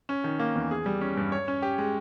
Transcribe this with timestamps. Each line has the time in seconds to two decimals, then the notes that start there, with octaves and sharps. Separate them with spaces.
0.09 C#4
0.24 D#3
0.39 A#3
0.55 E2
0.71 G#4
0.86 G3
1.01 C#4
1.17 G2
1.32 C#5
1.48 C#4
1.62 G4
1.78 G#3